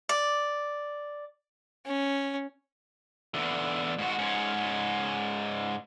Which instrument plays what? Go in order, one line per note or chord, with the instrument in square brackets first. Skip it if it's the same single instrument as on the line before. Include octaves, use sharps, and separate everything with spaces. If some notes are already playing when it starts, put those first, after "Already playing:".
[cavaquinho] D5
[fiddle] C#4
[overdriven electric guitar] E2 D3
G#2 F#4
G#2 C#4